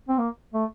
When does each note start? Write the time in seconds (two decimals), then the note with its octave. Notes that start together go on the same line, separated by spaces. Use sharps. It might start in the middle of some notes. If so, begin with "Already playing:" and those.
0.09 C4
0.18 A#3
0.54 A3